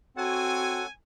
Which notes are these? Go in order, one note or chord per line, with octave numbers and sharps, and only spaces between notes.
C4 F#4 A4 C#5 F#5 G#5